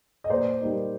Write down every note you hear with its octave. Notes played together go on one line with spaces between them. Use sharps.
D#5
A#2 C5 D5
G3 A#3 D#4